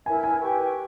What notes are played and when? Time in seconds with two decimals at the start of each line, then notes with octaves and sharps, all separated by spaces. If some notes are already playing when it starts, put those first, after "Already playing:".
0.06 E4 A#4 E5 G#5
0.24 G#5
0.40 G4 B4 G5 C#6